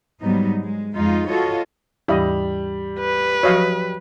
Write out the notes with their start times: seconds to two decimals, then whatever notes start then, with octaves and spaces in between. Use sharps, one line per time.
0.21 G#2 F#3 G3 B3 D#4
0.62 G#3
0.95 F2 G#3 D#4 F4
1.28 F4 F#4 A4 C#5 D#5
2.08 D#2 G#2 E3 G3 E4 D#5
3.00 B4
3.43 F3 F#3 F#4 C#5 D#5 F5